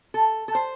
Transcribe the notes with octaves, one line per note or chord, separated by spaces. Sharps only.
A4
A4
C5